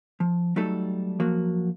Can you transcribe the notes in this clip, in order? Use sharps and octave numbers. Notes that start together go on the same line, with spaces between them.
F3
F#3 G3 A3 D#4 A4
F3 F#3 A#3 F#4